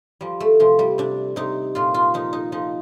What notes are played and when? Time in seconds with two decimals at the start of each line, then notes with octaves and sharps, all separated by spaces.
0.21 F3 G3
0.40 A3
0.60 C3 F3
0.79 G3
0.98 C3 D4
1.36 C3 D#4
1.75 A#2 F4
1.94 F4
2.14 F3 D#4
2.33 D#4
2.52 F3 D#4